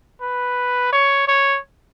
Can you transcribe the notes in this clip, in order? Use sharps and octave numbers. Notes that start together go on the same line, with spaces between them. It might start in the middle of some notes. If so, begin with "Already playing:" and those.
B4
C#5
C#5